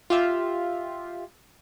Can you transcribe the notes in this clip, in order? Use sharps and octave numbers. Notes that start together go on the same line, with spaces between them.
F4 G4 E5